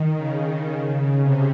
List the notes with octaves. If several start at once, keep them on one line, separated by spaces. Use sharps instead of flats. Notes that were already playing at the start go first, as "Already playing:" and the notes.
Already playing: D#3
C#3
C3